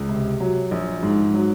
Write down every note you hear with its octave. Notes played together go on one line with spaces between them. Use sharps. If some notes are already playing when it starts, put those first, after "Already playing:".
Already playing: C#2
C3
F#3
A#1
G#2
F#3